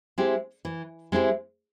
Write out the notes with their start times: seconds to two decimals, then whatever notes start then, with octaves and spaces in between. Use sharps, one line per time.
0.18 G#3 C4 E4 G4
0.65 E3
1.12 G#3 C4 E4 G4